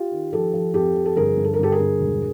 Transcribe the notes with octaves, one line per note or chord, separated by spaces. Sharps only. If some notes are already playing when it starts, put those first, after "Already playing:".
Already playing: F4 G4
D#3
F3 G4 A4
F3
F2 G4 A4
F3
A4
G1 G#4 A#4
G2
A4
A#4
G1 G4 A4
G#4 A#4
G1
E1